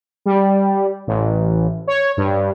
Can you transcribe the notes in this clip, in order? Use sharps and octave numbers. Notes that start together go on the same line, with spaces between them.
G3
A1
C#5
G2